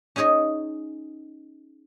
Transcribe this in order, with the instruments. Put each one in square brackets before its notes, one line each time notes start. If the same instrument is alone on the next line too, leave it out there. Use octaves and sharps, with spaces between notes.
[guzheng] C#4 D#4 G#4 C#5 D#5